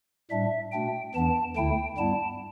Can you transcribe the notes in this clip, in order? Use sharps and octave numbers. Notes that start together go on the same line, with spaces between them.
A2 G3 D4 E5
B2 A3 D4 G5
E2 E3 B3 D4 A5
D2 D3 A3 E4 G5
G2 G3 B3 E4 A5